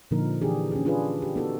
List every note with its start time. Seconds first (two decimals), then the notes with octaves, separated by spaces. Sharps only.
0.11 A#2 D3 F3 A#3 D#4 A#4
0.42 E3 D4 G4 G#4
0.71 C#4 G#4
0.85 D4 F4 G#4 B4
1.22 G4
1.36 B3 D#4 F#4 A4